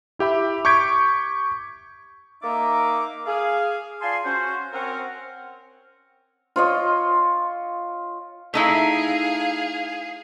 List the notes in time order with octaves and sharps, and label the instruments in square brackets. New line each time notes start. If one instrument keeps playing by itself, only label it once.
[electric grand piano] E4 G4 E5 B5
C#6 D6 G6 G#6 B6 D7
[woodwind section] A#3 D#4 E5 D6
G#4 F5
F4 D5 G#5 A5 C6
C#4 F#4 C5
C4 C#4 A#4 F#5
[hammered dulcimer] F4 C#5 D#5
[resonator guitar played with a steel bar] A3 D#4 E4 [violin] G#4 F5